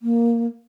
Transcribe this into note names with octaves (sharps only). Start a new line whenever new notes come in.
A#3